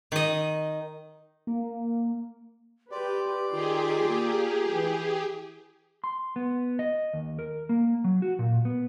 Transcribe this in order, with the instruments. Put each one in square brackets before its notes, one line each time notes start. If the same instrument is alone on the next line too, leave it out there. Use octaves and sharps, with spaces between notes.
[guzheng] D#3 D#5
[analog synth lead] A#3
[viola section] G4 B4 [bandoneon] D5 [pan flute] C6
[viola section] D#3 C6 [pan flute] F4 [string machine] G4 G#4
[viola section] A#3
E3
[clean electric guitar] C6
B3
D#5
D#2
A#4
A#3
F#3
F#4
A#2
B3